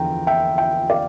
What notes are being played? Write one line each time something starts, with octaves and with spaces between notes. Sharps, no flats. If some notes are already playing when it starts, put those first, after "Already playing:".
Already playing: E2 D3 F3 G5 A#5
E5 G5
E5 G5
D5 F5